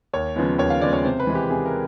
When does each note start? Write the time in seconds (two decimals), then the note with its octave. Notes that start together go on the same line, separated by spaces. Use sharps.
0.13 D#2 C#5
0.36 C#3 F3 G#3 B3
0.58 D#2 C#5
0.70 F5
0.81 C#3 F3 G#3 B3 D5
0.93 C#5
1.05 C3 C5
1.20 B4
1.27 E3 G#3
1.35 G4
1.50 C3 G#4
1.66 A#4